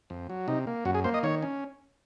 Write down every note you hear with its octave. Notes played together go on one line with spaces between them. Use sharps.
F2
F#3
C3 D#4
A#3
F#2 F#4
G#4
A#3 C5
D#5
D#3 C#5
C#4